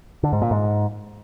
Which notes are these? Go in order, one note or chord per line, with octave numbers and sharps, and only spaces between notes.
D3
G#2
A#2
G#2